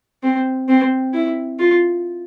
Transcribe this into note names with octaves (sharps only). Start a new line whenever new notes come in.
C4
C4
E4
F4